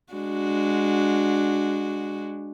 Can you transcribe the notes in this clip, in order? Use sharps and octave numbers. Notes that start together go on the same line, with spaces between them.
G#3 D4 F#4